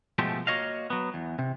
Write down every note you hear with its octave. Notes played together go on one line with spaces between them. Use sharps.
B2 F3 G#3 A3 F4 G4
A#3 F#4 C#5 D#5 F5
F#3 B3
E2
C3